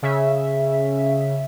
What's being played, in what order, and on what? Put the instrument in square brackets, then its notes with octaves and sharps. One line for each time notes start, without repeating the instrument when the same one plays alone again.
[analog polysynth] C#3 E5